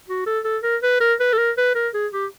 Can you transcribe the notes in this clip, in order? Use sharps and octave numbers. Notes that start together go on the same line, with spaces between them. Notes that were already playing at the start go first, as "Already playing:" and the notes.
F#4
A4
A4
A#4
B4
A#4
B4
A4
A#4
B4
A#4
G#4
G4